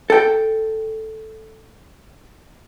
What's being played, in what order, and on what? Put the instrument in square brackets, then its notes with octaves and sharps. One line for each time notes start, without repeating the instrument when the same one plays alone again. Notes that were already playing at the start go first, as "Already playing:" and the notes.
[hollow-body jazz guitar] A4 G5